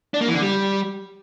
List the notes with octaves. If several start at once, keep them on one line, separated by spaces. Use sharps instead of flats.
D4
A#3
E3
D3
G3